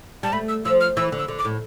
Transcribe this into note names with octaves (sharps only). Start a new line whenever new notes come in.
G3 A5
A3 B5
E6
F3 E6
F6
E3 E6
D3
E6
D3
D6
A2